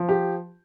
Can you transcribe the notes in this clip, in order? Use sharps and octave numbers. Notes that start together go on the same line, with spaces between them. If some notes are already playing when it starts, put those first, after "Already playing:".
Already playing: F3
G4